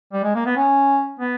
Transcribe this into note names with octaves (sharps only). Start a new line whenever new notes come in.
G3
G#3
A#3
B3
C#4
B3